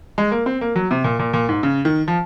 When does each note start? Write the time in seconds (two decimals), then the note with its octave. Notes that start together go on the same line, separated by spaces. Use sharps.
0.18 G#3
0.31 A#3
0.46 C4
0.61 A#3
0.76 F#3
0.91 C3
1.04 A#2
1.19 A#2
1.34 A#2
1.49 G#2
1.63 C#3
1.85 D#3
2.08 F3